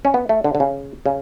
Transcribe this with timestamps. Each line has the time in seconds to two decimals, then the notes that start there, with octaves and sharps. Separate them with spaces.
0.05 C#4
0.14 B3
0.29 A3
0.44 D3
0.55 D3
0.60 C#3
1.06 C#3